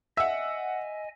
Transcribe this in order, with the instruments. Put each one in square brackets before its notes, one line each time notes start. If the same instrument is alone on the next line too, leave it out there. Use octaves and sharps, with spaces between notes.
[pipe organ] D#5 G#5 [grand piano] E5 [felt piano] F#5 E6